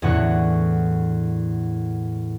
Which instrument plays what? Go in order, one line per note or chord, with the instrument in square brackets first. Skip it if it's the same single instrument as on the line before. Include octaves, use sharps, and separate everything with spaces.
[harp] E2 A2 D3 F#5 C#6 F#6